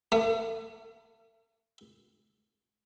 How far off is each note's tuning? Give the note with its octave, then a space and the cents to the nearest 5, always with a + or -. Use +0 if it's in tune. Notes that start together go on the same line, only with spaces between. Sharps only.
A3 +40